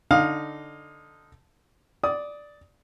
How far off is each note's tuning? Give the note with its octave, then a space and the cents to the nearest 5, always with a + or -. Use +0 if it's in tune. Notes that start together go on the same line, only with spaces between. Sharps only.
D3 +0 D#4 -5 F5 +20
D5 +0 D#6 +20